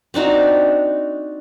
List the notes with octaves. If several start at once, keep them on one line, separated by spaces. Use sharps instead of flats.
C4 D4 D#4 F#4